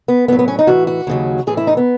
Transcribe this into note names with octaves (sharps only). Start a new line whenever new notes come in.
B3
A2 F#3 B3
B3
C#4
D#4
A2 E3 F#4
F#4
D#2 C#3 F#3
A2 E3 G#4
E4
D#4
B3